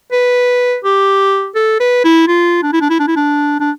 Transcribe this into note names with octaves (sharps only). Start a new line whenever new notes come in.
B4
G4
A4
B4
E4
F4
D4
E4
D4
E4
D4
E4
D4
D4